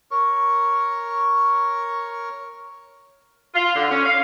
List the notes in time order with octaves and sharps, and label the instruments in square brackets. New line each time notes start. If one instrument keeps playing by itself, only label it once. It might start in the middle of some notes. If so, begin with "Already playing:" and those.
[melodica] A#4 C#5 C#6
[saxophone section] F4
D3
C#4
F5